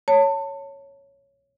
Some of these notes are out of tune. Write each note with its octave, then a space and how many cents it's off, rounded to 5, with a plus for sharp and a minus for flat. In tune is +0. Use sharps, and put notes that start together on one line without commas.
C#5 +0 A5 +30